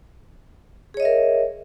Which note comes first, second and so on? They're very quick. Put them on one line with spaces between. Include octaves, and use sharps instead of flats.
G#4 C#5 D#5 E5 A#4